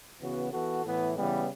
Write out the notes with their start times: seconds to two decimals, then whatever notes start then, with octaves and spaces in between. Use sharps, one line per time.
0.19 C#3 E3 B3 F#4
0.51 E3 B3 F#4 A4
0.83 A2 E3 B3 E4
1.15 C#3 E3 G3 B3